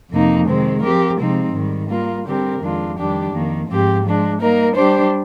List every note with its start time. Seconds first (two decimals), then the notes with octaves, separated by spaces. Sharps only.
0.10 F2 C3 F3 A#3 D#4
0.46 C3 D#3 G#3 C4
0.82 F3 C4 G4 A#4
1.19 C3 F3 G#3 C4 D#4
1.53 G#2 D#3 G3
1.89 G3 A#3 F4 A#4
2.25 D3 G3 C4 G4 A#4
2.60 F2 D#3 G#3 D4 F4
2.97 F2 D#3 G3 D4 G4
3.32 F2 D#3 A#3
3.68 G#2 F3 C4 G4
4.04 F3 G#3 D4
4.40 G3 A#3 D#4 A#4
4.75 G3 D4 G4 C5